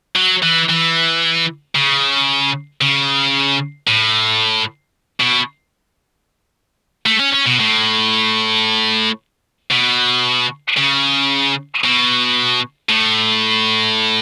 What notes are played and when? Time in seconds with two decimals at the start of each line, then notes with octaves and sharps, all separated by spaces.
0.16 F#3
0.42 E3
0.69 E3
1.75 C#3
2.81 C#3
3.88 A2
5.20 B2
7.06 A3
7.19 C#4
7.33 C#4
7.46 B2
7.59 A2
9.71 B2
10.77 C#3
11.84 B2
12.89 A2